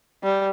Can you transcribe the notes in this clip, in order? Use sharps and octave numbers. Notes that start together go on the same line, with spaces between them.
G3